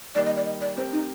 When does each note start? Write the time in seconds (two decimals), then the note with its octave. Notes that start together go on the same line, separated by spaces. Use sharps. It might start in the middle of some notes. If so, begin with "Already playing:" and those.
0.15 D#3 G3 A#3 D#4 D5
0.26 D#5
0.36 D5
0.45 D#5
0.61 D5
0.77 A3 C4 G4 A#4 C5
0.92 D#4